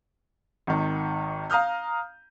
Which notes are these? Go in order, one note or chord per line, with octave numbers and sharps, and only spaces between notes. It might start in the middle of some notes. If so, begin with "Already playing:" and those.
G#1 D#3
F5 A#5 D#6 F6 G6